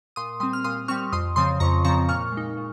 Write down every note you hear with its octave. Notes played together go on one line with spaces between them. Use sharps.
A#2 C6 D#6
G3 C4 C6 D#6
F6
A#2 C6 D#6
G3 C4 C#6 F6
F2 C6 D#6
C#3 F3 C4 C6 D#6
F2 A#5 C#6
C#3 F3 C4 A#5 C#6
A#2 C#6 F6
G#3 D#4
A#2